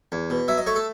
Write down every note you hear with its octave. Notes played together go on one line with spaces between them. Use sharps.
E2
B2
F#3 E5
D#5
A3 C#5
A4